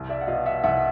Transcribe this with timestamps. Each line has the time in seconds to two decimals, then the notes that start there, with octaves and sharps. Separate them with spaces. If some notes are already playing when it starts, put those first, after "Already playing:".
Already playing: C2
0.09 D5 E5
0.21 F#5
0.27 B2 D#5 F5
0.46 E5 F#5
0.63 C2 E5 F#5